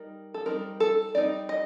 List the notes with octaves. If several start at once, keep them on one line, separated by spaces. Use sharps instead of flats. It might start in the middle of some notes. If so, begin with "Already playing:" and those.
Already playing: G3 D#4 A#4
A4
G3 C4 D#4 A#4
A4
G3 C4 D#4 D5
D#5